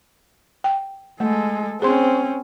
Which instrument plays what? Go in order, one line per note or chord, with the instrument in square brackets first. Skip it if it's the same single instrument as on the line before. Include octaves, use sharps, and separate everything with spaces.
[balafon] G5
[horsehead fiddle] G#3 A4 [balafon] A3
[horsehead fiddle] C4 C#4 [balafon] G#4 C5 C6